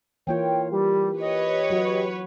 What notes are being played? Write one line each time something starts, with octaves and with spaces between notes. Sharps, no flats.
E3 A#3 F4 C#5 G5
G3 G4
B4 C#5 D#5
F#3 F#4